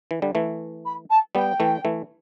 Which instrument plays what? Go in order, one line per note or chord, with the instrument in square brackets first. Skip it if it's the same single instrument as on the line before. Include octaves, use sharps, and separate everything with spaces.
[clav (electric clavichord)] E3
D3 G3
E3 A3
[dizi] B5
A5
[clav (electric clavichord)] G3 B3 [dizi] G5
[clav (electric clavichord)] E3 A3
E3 A3